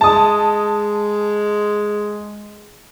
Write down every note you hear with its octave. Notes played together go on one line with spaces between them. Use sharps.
G#3 A5 D#6